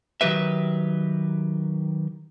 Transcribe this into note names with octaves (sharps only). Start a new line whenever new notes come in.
D#3 F#3 G4 B4 E5